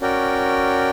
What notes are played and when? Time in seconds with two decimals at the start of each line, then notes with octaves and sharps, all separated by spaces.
0.01 C#4 F#4 A#4 D5 G5